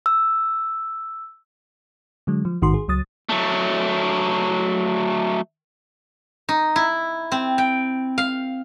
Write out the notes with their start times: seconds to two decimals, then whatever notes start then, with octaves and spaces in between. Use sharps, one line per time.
0.06 E6
2.27 D3 F#3 G#3
2.45 F3
2.62 A1 G#2 D#3 F#4 C6
2.74 G#4
2.88 C#2 F#3 D#6 A6
3.29 F#3 A3
6.49 D#4
6.76 E4
7.32 C4
7.58 G5
8.18 F5